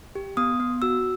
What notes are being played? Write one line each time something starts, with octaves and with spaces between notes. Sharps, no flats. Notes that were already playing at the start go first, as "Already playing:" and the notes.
G4
B3 D#6
B3
F#4 E6